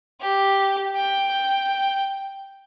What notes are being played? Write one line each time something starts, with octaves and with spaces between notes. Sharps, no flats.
G4
G5